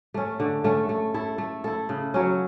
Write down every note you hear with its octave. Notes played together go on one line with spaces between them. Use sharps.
A3 C#4
D3
A3 C#4
A3
E4 A4
A3
E4 A4
C#3
F#3 C#4